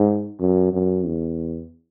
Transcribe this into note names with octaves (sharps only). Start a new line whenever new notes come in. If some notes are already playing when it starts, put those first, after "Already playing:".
Already playing: G#2
F#2
F#2
E2